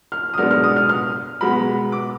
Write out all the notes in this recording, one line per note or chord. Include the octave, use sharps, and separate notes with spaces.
F6
D#6
B2 G#3 B3 D4 F6
F6
D#6
F6
F6
B2 G#3 B3 B5
D6